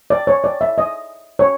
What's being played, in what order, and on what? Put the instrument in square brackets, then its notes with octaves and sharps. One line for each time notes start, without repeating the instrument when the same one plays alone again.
[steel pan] D5
C#5
D5
E5
D#5
C#5